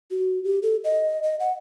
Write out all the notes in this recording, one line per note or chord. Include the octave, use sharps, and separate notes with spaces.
F#4
G4
A4
D#5
D#5
F#5